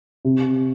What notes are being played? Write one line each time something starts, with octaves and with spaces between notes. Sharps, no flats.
C3